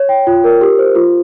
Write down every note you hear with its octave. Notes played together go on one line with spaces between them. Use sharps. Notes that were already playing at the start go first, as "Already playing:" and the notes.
Already playing: C#5
G5
F4
A#4
G4
C5
F4